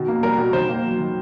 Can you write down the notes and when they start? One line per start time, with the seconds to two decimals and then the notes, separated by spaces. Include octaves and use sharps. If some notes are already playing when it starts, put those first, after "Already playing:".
Already playing: B2 D#3
0.08 A#3
0.23 G3 A#4
0.38 B2
0.53 D#3 C5
0.69 A#3
0.84 F#3
0.99 D#3